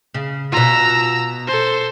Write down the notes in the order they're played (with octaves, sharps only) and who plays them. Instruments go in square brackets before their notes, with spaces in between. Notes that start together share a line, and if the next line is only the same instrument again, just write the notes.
[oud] C#3
[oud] B2 F4 [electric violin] A#5 E6
[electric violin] A4 C5